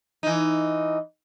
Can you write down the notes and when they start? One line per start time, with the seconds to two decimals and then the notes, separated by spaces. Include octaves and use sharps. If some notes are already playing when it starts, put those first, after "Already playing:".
0.23 E3 D#4